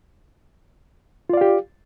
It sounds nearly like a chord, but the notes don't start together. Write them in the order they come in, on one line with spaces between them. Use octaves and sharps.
F4 D5 F5 G4